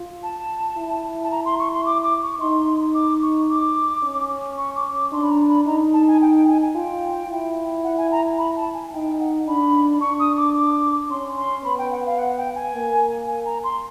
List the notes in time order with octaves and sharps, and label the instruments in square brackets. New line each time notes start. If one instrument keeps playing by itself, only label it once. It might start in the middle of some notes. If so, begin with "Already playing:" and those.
Already playing: [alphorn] F4
[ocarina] A5
[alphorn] E4
[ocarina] A5
A#5
C6
C#6
C6
D6
D6
C#6
[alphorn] D#4 [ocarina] C6
[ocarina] D6
C#6
D6
[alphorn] C#4
[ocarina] C#6
D6
D6
[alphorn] D4 [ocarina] C6
[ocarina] B5
A#5
B5
[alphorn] D#4 [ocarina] A#5
[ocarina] A5
G#5
G5
G5
G#5
G#5
[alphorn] F4 [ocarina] G5
[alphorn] E4
[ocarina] F#5
G#5
A#5
B5
A5
G#5
[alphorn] D#4 [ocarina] G5
[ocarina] F#5
[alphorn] D4 [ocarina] B5
[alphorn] D4 [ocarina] C#6
[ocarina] D#6
D6
D6
[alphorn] C#4 [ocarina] C6
[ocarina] C6
[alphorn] B3 [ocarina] B5
[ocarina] G5
F#5
F5
F#5
G5
G#5
[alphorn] A#3
[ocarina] G#5
A#5
C6